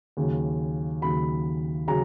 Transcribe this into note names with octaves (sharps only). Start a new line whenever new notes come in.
D#2 C#3 F#3
D#2 C#3 F#3 B5
C#3 F#3 A#5